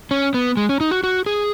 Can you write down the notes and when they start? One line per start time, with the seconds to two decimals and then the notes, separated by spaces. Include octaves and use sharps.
0.11 C#4
0.34 B3
0.57 G#3
0.69 C#4
0.81 D#4
0.91 F#4
1.04 F#4
1.26 G#4